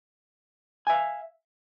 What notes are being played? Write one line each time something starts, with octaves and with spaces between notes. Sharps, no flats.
E5 F5 G#5